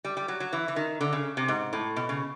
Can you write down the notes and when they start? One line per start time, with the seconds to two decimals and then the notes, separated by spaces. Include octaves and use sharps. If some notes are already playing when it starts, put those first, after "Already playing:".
0.05 G3
0.17 G3
0.28 F#3
0.40 F#3
0.53 E3
0.68 E3
0.76 D#3
1.01 D3
1.13 C#3
1.37 C3
1.48 G#2
1.73 A2
1.96 B2
2.09 C#3